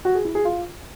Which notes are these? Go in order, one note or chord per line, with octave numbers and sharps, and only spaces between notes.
F#4
G#4
E4
G#4
F4